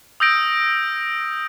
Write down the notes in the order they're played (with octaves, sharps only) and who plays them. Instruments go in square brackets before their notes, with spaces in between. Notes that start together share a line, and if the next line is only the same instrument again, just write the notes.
[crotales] D#6 E6 G6 A#6 D7